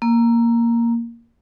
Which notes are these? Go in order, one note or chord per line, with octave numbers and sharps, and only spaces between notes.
A#3